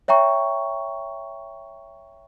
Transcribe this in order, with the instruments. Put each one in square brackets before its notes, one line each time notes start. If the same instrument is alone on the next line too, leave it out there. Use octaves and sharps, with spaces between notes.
[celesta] C#5 E5 G5 A#5 C#6